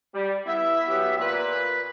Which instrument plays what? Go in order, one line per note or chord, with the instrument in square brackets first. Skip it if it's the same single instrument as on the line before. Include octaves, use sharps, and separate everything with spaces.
[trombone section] G3
[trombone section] B3 E4 [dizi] E5
[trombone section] F#3 B3 G4
[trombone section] A#2 [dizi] B4